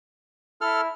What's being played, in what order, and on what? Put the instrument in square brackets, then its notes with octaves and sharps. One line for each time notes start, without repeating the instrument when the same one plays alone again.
[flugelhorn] E4 [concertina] A4 F6